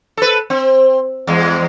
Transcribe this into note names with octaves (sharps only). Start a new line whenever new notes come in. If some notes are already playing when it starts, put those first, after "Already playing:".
A4 B4
C4
E2 G#3